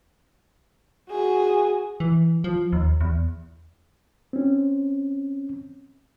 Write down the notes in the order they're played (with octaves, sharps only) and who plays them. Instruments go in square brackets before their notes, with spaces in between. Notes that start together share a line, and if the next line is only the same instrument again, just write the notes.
[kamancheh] F#4 G#4
[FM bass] E3
F3
D#2
E2
[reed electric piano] C4 C#4